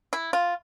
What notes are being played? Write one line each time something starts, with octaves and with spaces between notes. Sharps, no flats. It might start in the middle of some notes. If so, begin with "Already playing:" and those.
E4
F4